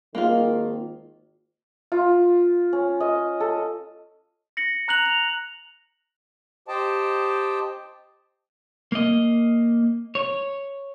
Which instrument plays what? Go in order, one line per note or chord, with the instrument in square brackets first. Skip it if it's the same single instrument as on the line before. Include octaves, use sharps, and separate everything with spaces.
[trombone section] G#1 D#3 [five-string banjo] A#3 F4
[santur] F4
C#4
D#5
A4
[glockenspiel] A#6 C#7 F#7
A#5 F#6 F7 F#7
F7
[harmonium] G4 C5 D#5 G5 A5
[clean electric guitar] A#3 D#5
C#5